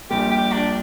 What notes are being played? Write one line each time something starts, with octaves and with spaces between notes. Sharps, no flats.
A#1 A#2 G3 G4
G4
D4